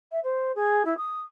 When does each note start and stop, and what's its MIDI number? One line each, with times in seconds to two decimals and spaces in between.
0.12 0.20 76
0.24 0.52 72
0.56 0.83 68
0.85 0.97 64
0.97 1.20 87